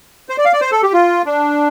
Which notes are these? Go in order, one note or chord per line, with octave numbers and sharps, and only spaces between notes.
C5
D5
F5
D5
C5
A4
G4
F4
D4